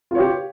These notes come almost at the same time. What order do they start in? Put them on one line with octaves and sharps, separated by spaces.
F4 C#5 G4